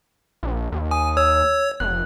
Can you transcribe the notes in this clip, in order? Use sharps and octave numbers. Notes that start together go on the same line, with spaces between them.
A#1
D#2
G#5 D#6
C#5 E6
F1 F#6